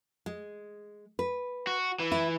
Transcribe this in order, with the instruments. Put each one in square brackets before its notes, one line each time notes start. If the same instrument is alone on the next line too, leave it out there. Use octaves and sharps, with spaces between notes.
[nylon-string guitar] G#3
B4
[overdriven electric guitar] F#4
E3
[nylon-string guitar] E4